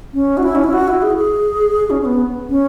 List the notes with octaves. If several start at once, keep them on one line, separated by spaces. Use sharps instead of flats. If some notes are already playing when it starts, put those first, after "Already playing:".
C#4
F#4
E4
C#4
E4
F#4
E4
G#4
G#4
C#4
C#4
B3
C#4